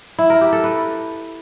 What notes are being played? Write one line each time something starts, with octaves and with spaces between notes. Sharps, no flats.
E4
A#4
G4
A4
B4